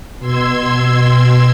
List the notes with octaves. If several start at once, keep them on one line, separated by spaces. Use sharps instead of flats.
B2 C6 E6 G#6